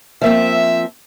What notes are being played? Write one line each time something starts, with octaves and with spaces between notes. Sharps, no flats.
F3 A#3 C4 E5